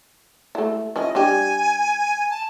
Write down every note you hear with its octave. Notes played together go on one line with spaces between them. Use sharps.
A3 E4
F3 C#4 E4 D#5
G3 D4 G4 G#5
A5